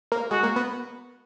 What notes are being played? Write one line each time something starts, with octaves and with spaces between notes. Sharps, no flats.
A#3
G#3 F#4
A#3
B3